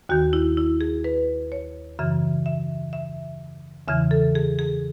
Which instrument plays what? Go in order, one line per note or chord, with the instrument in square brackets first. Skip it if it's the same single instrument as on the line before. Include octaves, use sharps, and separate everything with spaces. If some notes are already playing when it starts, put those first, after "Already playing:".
[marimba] D#2 D#3 F#4
E4
E4
G#4
B4
C#5
F#2 C#3 E3 E5
E5
E5
E2 C#3 E3 E5
A4
G#4
G#4